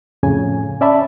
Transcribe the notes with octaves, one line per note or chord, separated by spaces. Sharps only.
F2 A2 C#3 G#5
C#4 D5 E5 A5 B5